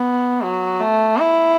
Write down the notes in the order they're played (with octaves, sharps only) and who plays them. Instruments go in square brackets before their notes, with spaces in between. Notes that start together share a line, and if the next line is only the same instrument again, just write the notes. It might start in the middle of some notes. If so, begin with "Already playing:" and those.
Already playing: [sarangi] B3
F#3
A3
E4